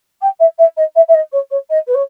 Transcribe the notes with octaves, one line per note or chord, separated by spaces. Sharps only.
G5
E5
E5
D#5
E5
E5
D#5
C#5
C#5
D#5
B4
C#5